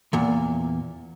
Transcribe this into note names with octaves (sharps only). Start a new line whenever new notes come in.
E2 A#2